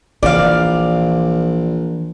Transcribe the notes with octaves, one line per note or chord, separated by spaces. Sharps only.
A#1 E3 D5 F5